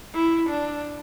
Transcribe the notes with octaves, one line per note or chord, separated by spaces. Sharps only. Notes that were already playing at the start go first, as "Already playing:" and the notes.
E4
D4